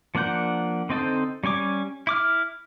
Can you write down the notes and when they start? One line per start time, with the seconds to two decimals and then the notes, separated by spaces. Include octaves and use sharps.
0.15 F3 A#3 D4 F#5 G6
0.89 D3 C4 D#4 A4 C5
1.44 G3 C#4 G#5 D6
2.07 E4 D6 F6